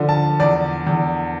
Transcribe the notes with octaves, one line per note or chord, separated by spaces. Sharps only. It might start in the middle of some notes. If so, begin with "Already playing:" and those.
Already playing: D3 F3
A5
E2 D5
E2